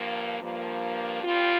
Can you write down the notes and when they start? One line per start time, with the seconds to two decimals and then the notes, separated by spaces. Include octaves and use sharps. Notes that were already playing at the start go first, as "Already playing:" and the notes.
Already playing: G2 F3 A#3
0.41 G2 F3 A#3
1.23 A#2 G3 C4 F4